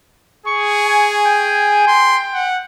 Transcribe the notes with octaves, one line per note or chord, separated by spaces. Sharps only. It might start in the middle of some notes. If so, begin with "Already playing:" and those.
G#4 C#6
G#5
G5
C6
F#5